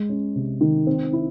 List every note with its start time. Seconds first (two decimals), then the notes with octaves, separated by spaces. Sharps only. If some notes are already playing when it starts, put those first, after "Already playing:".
Already playing: G#3
0.09 C#4
0.36 C3
0.61 D#3
0.87 C4
1.13 E4